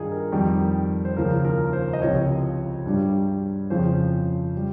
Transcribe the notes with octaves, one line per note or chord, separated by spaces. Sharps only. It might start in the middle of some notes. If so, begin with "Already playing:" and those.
Already playing: G2 D#3 G3 D#4 F4 G#4
A#4
F2 D#3 G3
C5
D#2 C#3 F3 A#4
A#4
C5
D#5
C#2 C3 F3 C#5
G2 G3
F2 C#3 F3 C5
G3